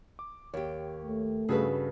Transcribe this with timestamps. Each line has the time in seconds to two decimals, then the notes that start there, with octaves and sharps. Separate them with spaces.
0.19 D6
0.54 D#2 G4 C#5
1.02 A3
1.49 G2 C#3 F#4 G#4 A4 B4